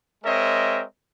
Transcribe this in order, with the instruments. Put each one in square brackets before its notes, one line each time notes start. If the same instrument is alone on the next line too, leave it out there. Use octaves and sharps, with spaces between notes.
[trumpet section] G#3 C4 A#4 C#5 D#5 E5